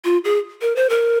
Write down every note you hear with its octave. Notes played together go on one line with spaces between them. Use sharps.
F4
G#4
A#4
C5
A#4